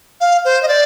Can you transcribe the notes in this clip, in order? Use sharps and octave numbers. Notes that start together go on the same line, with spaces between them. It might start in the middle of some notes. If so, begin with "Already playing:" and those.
F5
C5
D#5
D5